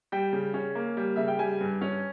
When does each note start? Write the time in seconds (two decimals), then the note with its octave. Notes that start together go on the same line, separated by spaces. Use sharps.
0.12 G3 G5
0.33 C#3
0.54 C#4
0.75 A#3
0.97 G3
1.16 C#3 E5
1.28 G5
1.39 G3 G#5
1.61 G2
1.81 C#4